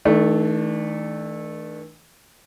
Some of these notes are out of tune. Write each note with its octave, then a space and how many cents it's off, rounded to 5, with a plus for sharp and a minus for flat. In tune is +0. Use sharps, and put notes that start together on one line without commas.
D#3 +45 A3 -15 D4 +25